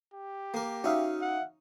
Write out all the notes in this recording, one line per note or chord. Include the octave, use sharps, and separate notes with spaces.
G4
A#3 A#4
C#4 D#4 F#4 E5 F5
F#5